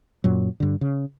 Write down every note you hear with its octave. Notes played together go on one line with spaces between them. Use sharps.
F#2 A#2 F#3
G2 D3
C#3